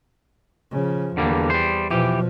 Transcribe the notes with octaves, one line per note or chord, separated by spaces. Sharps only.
C#3 F3
E2 D3 G3 A#3
G3 C5
B2 E3 F3 G4